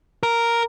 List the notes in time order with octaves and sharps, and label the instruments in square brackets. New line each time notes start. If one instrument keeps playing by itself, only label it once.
[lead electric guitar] A#4